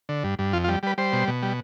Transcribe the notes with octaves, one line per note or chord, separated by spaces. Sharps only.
D3
G2
G2
F2 F4
F4
G3
G3 B4
G3 C5
B2
B2
G3